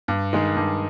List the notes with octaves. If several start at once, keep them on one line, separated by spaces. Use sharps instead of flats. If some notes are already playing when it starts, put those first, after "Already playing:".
G2
D#3 G#3
G2